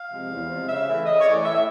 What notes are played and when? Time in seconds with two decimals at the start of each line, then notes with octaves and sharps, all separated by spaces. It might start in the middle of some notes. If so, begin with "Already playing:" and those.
Already playing: F5
0.09 C3 F3 G#3
0.29 E2
0.48 C3 F3 G#3
0.67 C#3 E5
0.86 E3 A3
1.06 C#3 D#5
1.18 C#5
1.26 E3 A3 D5
1.44 A2 E5
1.55 E5